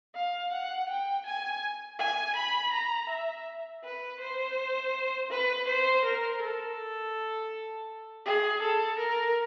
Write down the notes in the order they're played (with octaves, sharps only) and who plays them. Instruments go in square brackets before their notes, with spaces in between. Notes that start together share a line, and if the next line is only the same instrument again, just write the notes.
[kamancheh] F5
F#5
G5
G#5
G#5
B5
A#5
E5
B4
C5
B4
C5
A#4
A4
G#4
A4
A#4